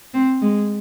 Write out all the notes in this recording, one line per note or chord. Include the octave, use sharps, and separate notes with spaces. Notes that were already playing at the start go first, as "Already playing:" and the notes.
C4
G#3